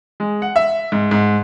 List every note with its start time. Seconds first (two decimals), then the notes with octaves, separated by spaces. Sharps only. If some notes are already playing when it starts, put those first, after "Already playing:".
0.20 G#3
0.42 F#5
0.56 E5
0.92 G#2
1.11 G#2